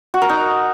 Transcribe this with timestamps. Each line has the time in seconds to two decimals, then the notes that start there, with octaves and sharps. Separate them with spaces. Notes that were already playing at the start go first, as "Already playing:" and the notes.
0.14 F#4
0.22 A#4
0.29 D#4